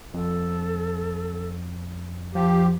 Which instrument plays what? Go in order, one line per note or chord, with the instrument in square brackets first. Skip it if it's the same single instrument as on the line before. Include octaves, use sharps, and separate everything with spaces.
[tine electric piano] F2 [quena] A4
[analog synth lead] F3 [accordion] G4 [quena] F5